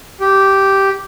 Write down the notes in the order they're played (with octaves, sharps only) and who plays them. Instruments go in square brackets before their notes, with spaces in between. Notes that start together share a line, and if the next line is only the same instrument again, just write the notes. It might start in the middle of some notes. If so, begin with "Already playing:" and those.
[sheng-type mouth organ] G4